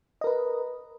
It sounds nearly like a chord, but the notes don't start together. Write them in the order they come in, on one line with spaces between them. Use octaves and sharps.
D#5 A#4 B4